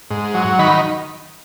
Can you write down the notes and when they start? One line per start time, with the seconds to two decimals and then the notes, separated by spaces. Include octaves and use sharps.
0.10 G#2
0.34 F#3
0.59 D#3 B5